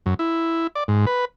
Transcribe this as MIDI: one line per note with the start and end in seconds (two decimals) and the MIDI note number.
0.06 0.14 42
0.19 0.67 64
0.75 0.84 74
0.88 1.05 44
1.07 1.25 71